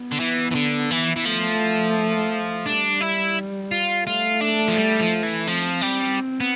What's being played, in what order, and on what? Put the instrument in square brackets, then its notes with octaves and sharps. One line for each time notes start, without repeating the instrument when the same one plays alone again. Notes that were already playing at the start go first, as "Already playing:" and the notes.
Already playing: [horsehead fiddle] B3
[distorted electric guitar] D3
E3
E3
D3
E3
E3
[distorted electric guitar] F3 [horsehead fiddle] A3
[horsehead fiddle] G3 [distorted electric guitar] D4
[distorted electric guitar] E4
F4
[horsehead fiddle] A3 [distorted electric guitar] F4
[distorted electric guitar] D4
F3
G3
F3
E3
[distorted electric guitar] F3 [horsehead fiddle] C4
[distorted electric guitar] G3
B3